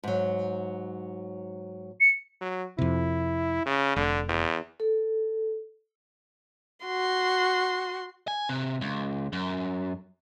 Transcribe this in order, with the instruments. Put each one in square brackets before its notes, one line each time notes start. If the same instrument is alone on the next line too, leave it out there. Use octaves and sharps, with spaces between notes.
[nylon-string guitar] G#2 F#3
[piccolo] C#7
[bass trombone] F#3
[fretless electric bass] F2 C3 [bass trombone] E4
[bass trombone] C#3
[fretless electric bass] F1 [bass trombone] D3
[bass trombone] E2
[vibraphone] A4
[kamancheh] F#4 C6
[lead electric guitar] G#5
C3
C#2
F#2